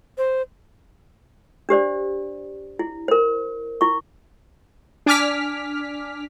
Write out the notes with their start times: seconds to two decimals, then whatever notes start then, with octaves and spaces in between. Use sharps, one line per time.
0.18 C5
1.69 D4 G4 C5 D5
2.79 E4
3.08 A#4 C5
3.81 E4 C#6
5.06 D4 G#5 D6 F6 B6